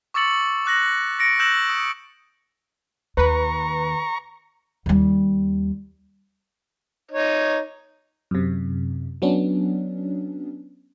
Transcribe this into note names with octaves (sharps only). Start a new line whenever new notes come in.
C#6 D6 E6 A6 C#7 F#7
D6 F#6 A#6 F#7
A#6 C#7 D7
E6 F#6 G6 A#6 E7 F#7
D#6
D#2 B4 A#5 C#6
D#2 G3
D#4 C#5
F#2 C3
F#3 B3 C#4 D4